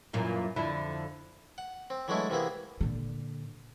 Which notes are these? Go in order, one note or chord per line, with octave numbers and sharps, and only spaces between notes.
F#2 A#2 E3
F2 D3 E4
F#5
C4
E3 F#3 G#3 A3 D4 E4
C3 E3 A#3 B3 G#4
A#2 D3